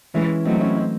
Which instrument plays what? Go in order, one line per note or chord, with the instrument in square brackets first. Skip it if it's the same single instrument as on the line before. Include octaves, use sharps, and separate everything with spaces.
[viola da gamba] E3 G#3 [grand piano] C#4 E4
[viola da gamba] F#3 A3 [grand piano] C4 D#4
[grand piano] C#4 E4
C4 D#4